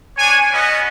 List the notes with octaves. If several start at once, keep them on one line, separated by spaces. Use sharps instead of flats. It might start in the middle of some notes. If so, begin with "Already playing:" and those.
D4 C#5 G#5
B3 C#4 F#4 B4 D#5